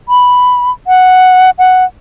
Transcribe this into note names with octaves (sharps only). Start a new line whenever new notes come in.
B5
F#5
F#5